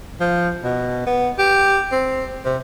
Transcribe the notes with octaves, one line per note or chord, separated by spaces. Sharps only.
F3
B2
B3
G4
C4
C3